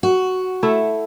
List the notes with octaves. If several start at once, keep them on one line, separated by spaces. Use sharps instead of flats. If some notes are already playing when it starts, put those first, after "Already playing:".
F#4
A3 E4 A4